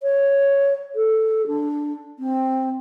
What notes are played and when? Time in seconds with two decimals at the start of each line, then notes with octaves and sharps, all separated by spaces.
0.03 C#5
0.95 A4
1.47 D4
2.19 C4